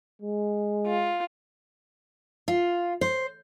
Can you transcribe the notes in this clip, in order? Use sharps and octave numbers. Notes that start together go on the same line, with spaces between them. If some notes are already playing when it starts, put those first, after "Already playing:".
G#3
F4
F4
C5